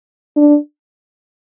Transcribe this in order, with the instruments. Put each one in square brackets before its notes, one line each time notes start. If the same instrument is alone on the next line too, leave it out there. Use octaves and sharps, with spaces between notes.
[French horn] D4